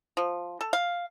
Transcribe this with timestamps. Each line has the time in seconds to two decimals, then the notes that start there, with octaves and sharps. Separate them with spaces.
0.17 F3
0.61 A4
0.73 F5